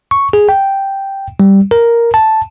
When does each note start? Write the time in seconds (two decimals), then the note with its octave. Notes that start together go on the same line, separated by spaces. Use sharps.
0.11 C#6
0.33 G#4
0.49 G5
1.40 G3
1.71 A#4
2.14 A5